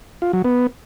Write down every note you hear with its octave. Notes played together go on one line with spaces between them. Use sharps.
F4
F#3
B3